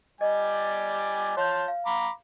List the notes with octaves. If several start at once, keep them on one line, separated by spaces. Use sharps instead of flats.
G3 D5 D#5 G#5
F4 C#5 A5 C6 G6
F5
A#5 B5 D6